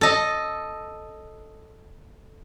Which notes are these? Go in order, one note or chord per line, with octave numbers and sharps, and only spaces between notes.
A4 D#5